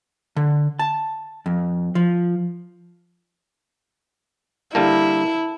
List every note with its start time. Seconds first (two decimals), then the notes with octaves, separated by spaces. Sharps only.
0.36 D3
0.79 A5
1.46 F2
1.95 F3
4.75 D3 G3 A#3 E4 A5